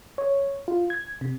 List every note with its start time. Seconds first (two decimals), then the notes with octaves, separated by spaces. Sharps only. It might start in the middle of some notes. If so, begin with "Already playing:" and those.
0.18 C#5
0.68 F4
0.90 G#6
1.21 C3